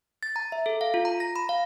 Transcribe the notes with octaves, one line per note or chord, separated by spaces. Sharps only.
A6
A#5
E5
A4
F5
F4
A#5
A#6
B5
F5